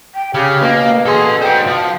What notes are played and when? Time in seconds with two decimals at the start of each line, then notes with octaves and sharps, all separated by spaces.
0.15 G5
0.34 C#3 C#4 G4
0.62 B2 A#3 F5
1.06 G#4 A4 C6
1.42 C5 F#5 G5
1.67 F3